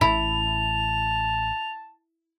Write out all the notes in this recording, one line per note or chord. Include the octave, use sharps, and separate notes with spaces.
A1 A2 E4 A5 F7